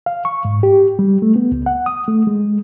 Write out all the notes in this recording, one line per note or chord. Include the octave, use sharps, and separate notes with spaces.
F5
C#6
G#2
G4
G3
A3
B3
C#2
F#5
D#6
A3
G#3